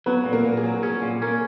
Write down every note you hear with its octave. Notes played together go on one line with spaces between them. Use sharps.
F#3 B3 B4
A#2
A#3 A#4
A#2
G#4
F#3
C#4 G#4
A#2
A#3 C#4 A#4